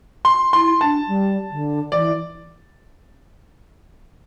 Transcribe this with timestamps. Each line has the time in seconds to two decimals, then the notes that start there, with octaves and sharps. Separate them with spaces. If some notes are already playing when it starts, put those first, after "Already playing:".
0.25 C6
0.53 E4 C6
0.81 D4 A5
1.08 G3
1.51 D3
1.92 E3 D5